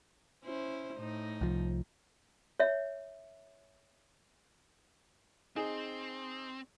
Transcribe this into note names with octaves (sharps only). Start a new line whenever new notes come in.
C#4 E4 C5
A2 D#4
C2 F3
C#5 E5
C4 D#4 G#4